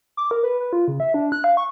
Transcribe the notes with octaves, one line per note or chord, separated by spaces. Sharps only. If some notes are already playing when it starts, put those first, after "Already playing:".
D6
A#4
B4
B4
F4
C#3
E5
D4
F#6
F5
C#6